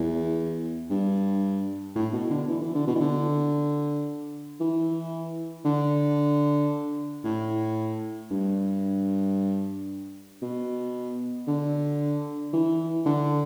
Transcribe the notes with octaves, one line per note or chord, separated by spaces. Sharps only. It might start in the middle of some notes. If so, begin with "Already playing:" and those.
Already playing: E2
G2
A2
B2
D3
E3
E3
D3
B2
E3
D3
E3
D3
A2
G2
B2
D3
E3
D3